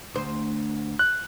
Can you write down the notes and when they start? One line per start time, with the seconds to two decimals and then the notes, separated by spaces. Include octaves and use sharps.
0.14 D2 C5
0.99 F#6